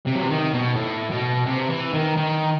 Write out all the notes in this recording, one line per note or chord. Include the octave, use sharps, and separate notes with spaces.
C3
F#3
E3
D#3
B2
A2
B2
C3
E3
D#3
D#3